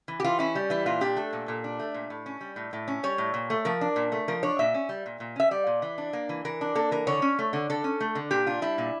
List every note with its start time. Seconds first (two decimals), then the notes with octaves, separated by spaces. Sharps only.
0.08 E3
0.20 G4
0.24 E3 F4
0.39 C#4 E4
0.55 G3
0.70 E3 E4
0.86 A#2 F4
1.01 D4 G4
1.16 A3 A4
1.33 A#2
1.48 A#2
1.64 D4
1.79 A3
1.94 A#2
2.10 A2
2.26 C#4
2.41 G3
2.56 A2
2.73 A2
2.88 C#4
3.03 G3 C#5
3.18 A2
3.34 A#2
3.50 A3
3.65 F3 A#4
3.81 D4
3.96 A#2
4.12 A3
4.28 F3 A#4
4.43 D4 C#5
4.59 A#2 E5
4.74 C#4
4.89 G3
5.06 A#2
5.20 A#2
5.36 C#4 E5
5.51 G3 D5
5.67 A#2
5.82 E3
5.98 D4
6.13 A#3
6.29 E3
6.45 E3 A#4
6.61 D4
6.75 A#3 A4
6.91 E3 A#4
7.07 D3 C#5
7.22 C#4
7.39 A3
7.53 D3
7.70 D3 A4
7.84 C#4
8.01 A3
8.15 D3
8.31 A#2 G4
8.46 D4 F4
8.62 G3 E4
8.78 A#2